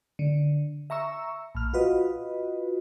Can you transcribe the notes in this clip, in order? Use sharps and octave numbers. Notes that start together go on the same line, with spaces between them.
D3
E5 A#5 C#6 E6
A#1 F6
F4 F#4 B4 D#5